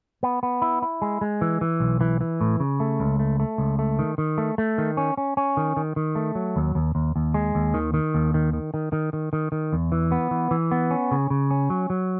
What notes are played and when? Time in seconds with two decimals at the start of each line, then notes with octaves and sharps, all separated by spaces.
0.23 B3
0.43 B3
0.62 E4
0.82 E4
1.02 G#3
1.21 G#3
1.41 E3
1.61 E3
1.80 B1
2.01 E3
2.21 E3
2.41 A2
2.60 C#3
2.80 A3
3.00 C#2
3.19 A3
3.40 A3
3.58 C#2
3.79 A3
3.99 D#3
4.18 D#3
4.38 A3
4.58 A3
4.78 D#3
4.97 C#4
5.17 C#4
5.37 C#4
5.57 D#3
5.77 D#3
5.96 D#3
6.15 A3
6.35 F#3
6.56 D#2
6.75 D#2
6.95 D#2
7.16 D#2
7.34 G#3
7.55 D#2
7.74 D#3
7.94 D#3
8.14 D#2
8.34 D#3
8.53 D#3
8.74 D#3
8.93 D#3
9.13 D#3
9.33 D#3
9.52 D#3
9.73 E2
9.92 E3
10.12 B3
10.31 E3
10.51 E3
10.71 B3
10.91 C#4
11.11 C#3
11.30 C#3
11.51 C#4
11.70 F#3
11.90 F#3